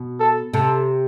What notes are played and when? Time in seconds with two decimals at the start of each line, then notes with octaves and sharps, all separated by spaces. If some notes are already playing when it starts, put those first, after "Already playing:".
Already playing: B2
0.20 A4
0.54 C3 A4